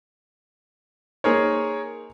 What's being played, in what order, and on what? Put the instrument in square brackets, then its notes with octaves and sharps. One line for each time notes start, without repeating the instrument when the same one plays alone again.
[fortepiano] A#3 D#4 C5 [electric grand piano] G#4 A#4 C#5